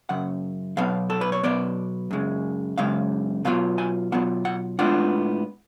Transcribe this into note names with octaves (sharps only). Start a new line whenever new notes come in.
F#2 C#3 F#5
B2 F#3 B3 F5
A4
B4
C#5
B2 F#3 B3 D5
F#2 C#3 G#3
F#2 C#3 G#3 F5
B2 F#3 B3 F4 F5
G#5
B2 F#3 B3 F4 F#5
F#5
A2 G#3 B3 D4 F4 F#5